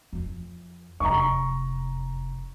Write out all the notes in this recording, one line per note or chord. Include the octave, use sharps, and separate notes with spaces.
F2 E3
F1 E2 A#5 C#6